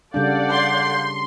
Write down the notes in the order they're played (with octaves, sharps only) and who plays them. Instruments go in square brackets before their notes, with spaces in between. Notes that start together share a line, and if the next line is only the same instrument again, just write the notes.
[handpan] C#3 G3 D4 [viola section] A4 D5 F#5 [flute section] F5 G6
[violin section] C6